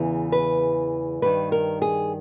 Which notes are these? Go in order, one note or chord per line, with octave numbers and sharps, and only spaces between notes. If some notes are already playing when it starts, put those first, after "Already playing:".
Already playing: E2 C#3 E3
B4
G2 D#3 B4
A#4
G#4